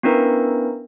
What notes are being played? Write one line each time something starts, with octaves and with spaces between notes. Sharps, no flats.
B3 C#4 D4 E4 A#4 B4